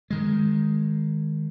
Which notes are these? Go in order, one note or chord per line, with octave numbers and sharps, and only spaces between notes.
D#3 G#3